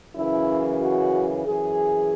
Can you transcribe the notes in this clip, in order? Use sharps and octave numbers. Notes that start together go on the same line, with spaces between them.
F#2 C#3 E3 E4
F#4
F#2 E3 G#4